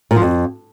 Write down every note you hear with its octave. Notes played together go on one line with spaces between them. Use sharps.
A#2
F3
F2